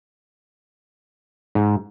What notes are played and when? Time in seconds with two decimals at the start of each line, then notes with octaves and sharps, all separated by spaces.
1.55 G#2